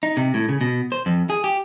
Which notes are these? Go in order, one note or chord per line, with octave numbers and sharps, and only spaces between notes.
D#4
C3
A2
C#3
B2
C5
F2
G#4
G4